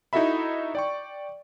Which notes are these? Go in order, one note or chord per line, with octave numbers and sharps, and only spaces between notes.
D#4 E4 F#4 A4 E5 B5
D5 G5 C#6